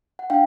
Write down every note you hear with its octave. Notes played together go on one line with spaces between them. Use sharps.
F#5
D4 F5 G5